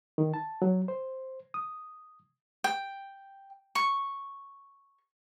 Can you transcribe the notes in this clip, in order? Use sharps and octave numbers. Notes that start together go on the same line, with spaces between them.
D#3
A5
F#3
C5
D#6
G5
C#6